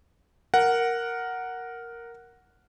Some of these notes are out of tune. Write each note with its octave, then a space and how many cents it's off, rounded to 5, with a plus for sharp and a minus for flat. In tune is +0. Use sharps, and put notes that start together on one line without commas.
A#4 +0 F#5 +0